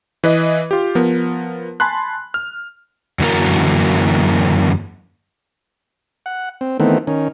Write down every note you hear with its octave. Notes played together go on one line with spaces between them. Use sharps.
E3 B4 D#5
F4 G4
F3 B3 A#4
G#5 A5 B5 C6 F#6
F6
F#2 D3 E3 A#3 F#4 A#4
F#5
C4
D#3 E3 A3 B3 C4
D#3 C#4